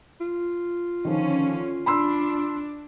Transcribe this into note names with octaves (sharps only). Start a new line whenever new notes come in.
F4
D3 D#3 F3 C#4
D4 B5 C6 E6